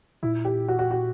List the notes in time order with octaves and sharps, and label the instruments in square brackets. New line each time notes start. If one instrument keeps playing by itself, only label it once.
[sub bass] A#2 [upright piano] E4
[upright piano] G4
F#4
F#4
F#4